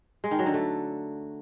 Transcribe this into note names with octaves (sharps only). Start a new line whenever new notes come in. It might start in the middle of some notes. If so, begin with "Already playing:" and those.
G#3
D#3
F#3
D3
A3